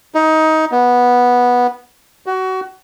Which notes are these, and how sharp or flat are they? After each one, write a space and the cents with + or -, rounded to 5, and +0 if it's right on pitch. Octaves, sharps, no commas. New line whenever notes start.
D#4 +20
B3 -10
F#4 +25